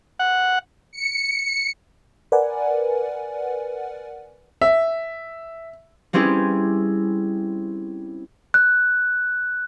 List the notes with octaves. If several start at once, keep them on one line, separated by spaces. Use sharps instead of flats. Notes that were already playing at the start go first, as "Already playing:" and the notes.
F#5
C#7
A#4 B4 D5 F#5 G#5
E5
G3 C4 C#4 E4 G4 G#4
F#6